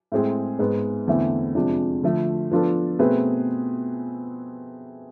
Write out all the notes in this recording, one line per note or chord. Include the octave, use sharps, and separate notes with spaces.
A2 G#3 C4 G#4
G#2 G#3 B3
E2 D3 A3 C4 E4
F2 C3 F3 G#3 D4
D3 F3 A3
F3 B3 D4 F4 A4
B2 A3 C4 G#4 B4